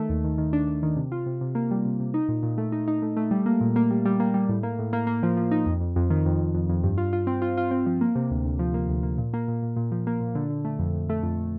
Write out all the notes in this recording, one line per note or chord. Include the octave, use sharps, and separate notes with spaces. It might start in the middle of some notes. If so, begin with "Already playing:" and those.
Already playing: D#3 A3
D#2
D#3
D#3
D4
D4
D#3
C3
F4
C3
C3
A#3
G3
C3
C3
D#4
A#2
A#2
A3
D#4
D#4
A3
A3
G3
A#3
A#2
A#3
G3
G3
A#3
G3
A2
A#3
A2
A#3
A#3
F3
F3
D#4
F2
F2
F2
D#3
F2
F2
F2
F2
G2
F4
F4
C4
F4
F4
C4
F3
A#3
C3
D2
D2
F3
A#3
D2
A#3
A#2
A#3
A#2
A#2
A#2
F3
A#3
A#2
D3
D3
A3
F2
F2
A3
F2